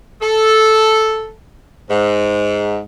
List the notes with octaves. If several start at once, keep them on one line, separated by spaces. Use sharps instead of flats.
A4
G#2